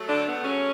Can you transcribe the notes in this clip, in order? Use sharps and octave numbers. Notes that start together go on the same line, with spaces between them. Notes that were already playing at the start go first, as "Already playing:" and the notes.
Already playing: F#3 A3
D3 D4
B3
C#3 F#3 A3 C#4